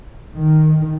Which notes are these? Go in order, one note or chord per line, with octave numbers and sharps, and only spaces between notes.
D#3